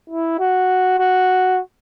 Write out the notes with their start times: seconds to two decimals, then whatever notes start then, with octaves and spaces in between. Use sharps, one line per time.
0.10 E4
0.39 F#4
0.99 F#4